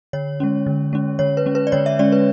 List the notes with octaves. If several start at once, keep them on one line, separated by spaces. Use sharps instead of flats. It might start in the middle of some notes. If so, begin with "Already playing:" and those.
D3 C#5
G#3 C#4
D3
G#3 C#4
D3 C#5
B4
G#3 C#4
B4
D5
D3 C#5
E5
G#3 C#4 D5
B4